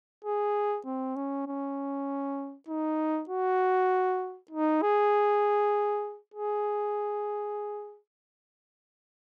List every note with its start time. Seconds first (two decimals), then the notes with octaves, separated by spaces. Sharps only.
0.24 G#4
0.85 C4
1.16 C#4
1.47 C#4
2.68 D#4
3.29 F#4
4.51 D#4
4.82 G#4
6.34 G#4